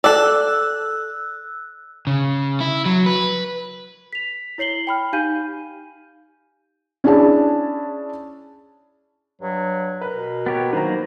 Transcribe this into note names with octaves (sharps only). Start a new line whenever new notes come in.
A4 D5 E6 F#6
C#3
E4
F#3
B4
B6 F7
E4 C#5 C7 F#7 G7
G5 B5 F6
D#4 G4 F5 G#5 G6 D#7
C#4 D4 E4 G#4 C#5 A5
G2 F#3
A#4 B4
B2
B3 G4 C#5
D#3 F#3 A#3 B4 C5 A#5